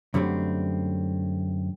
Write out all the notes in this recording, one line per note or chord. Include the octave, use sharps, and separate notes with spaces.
F#2 D3 G3 A3 C4